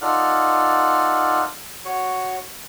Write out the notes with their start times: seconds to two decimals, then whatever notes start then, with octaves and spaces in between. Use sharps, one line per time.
0.02 D#4 F4 A4 D5 F#5 F6
1.85 F#4 C#5